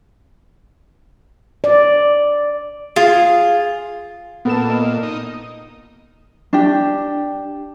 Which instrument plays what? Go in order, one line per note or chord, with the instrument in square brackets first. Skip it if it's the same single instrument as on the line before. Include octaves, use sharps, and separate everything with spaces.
[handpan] D5
[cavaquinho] F4 [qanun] G#4
[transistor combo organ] A#2 [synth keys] B3 A4 E7
[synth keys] D#5
[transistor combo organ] D#4
[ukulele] D4 G4